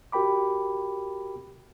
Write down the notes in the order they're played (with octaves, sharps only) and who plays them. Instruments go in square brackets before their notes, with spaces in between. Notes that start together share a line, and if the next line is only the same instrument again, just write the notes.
[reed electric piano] F#4 G4 A#4 G5 B5 D6